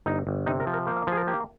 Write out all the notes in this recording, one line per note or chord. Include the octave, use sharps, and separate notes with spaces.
G1 D#4
G1
C3 D#4
A#4
F3
A#4
A#3 C5
F5
F3 G#4
A#4
A#3 G4